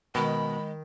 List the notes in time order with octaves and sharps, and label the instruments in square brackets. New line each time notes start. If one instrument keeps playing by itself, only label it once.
[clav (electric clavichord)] B2 [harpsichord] D#3 [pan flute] G#3 [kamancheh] B5